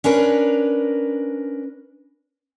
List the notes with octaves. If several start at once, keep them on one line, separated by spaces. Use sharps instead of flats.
C#4 D4 A#4 B4